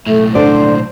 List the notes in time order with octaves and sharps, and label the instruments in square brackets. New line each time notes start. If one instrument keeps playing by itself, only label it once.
[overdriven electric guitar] B1 A2 [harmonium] A3
[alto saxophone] D3 [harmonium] C5 [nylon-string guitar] D5